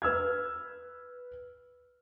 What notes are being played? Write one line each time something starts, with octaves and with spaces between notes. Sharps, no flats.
B4 E6 F6 G#6